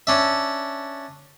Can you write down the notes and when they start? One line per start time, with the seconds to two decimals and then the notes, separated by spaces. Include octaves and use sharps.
0.07 C#4 D4 E5